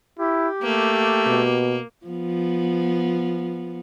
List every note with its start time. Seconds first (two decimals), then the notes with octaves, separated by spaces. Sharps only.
0.19 E4 G4
0.63 A3 A#3
1.26 B2
2.06 F3 B3